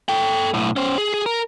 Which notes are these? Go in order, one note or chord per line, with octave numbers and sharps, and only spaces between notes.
A4 G5
B1 A2
C#4 C5
G#4
G#4
A#4